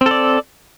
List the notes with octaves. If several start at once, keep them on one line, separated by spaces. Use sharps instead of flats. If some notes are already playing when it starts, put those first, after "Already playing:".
C4 A4 D5